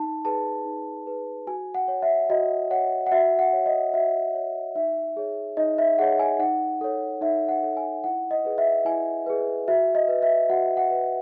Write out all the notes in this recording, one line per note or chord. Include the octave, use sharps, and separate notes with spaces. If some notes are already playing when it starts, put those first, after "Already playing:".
Already playing: D#4 A5
G#4 B4 A5
D#4
G#4 B4
F#4 G#5
F#5
C#5
E5
F#4 D#5
C#5 F#5
F#5
F#4 E5
F#5
C#5
D#5
F#4 E5
C#5
D#4 E5
G#4 C#5
D#4 D#5
E5
G#4 C#5 F#5
G#5
D#4 F#5
A4 C#5
D#4 E5
F#5
A4 C#5
G#5
E4 F#5
D#5
G#4 B4
E5
E4 G#5
G#4 B4
F#4 E5
D#5
B4
E5
F#4 F#5
F#5
B4